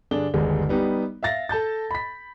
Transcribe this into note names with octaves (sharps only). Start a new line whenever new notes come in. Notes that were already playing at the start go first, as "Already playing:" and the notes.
G2 D3 D4 G#4 G7
G1 D#2 G3 G#3
G3 B3 D#4 G4
E5 F5 A6 A#6
A4 A5 G6 A6
B5 B6